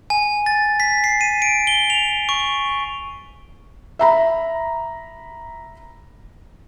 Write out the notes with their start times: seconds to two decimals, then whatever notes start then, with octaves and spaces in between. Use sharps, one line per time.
0.10 G#5
0.46 A6
0.80 B6
1.04 C7
1.21 D#7
1.42 D7
1.67 G7
1.90 F7
2.29 C#6
3.99 E5 A#5 B5